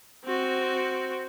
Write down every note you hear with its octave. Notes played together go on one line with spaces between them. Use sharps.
C4 F#4